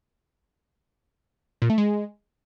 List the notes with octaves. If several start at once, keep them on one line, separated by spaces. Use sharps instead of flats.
A#2
A3
G#3